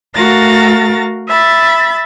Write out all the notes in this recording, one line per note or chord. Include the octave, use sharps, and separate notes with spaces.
A3 F#4 A#4 F5 A6 A#6
E5 B5 A6